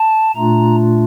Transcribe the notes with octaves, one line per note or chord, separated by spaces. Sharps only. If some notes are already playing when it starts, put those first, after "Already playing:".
Already playing: A5
A#2 A3 D4 F4 A#5